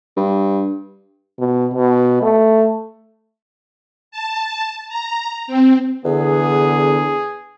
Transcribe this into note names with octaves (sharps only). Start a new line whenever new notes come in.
G2
B2
B2
A3
A5
A#5
C4
E2 D3 B3 G#4